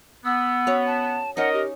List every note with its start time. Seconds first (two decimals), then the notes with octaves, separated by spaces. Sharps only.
0.25 B3 E6
0.67 C#4 F#4 C#5
0.86 A5
1.37 C#4 D#4 A#4 D#5 F#5
1.53 G4